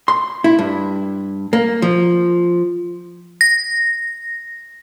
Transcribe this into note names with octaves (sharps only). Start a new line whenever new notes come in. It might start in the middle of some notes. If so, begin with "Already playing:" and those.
C6
E4
G2
A#3
F3
A#6